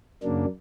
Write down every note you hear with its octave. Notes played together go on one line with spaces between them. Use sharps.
F#2 C#3 F#3 A#3 D4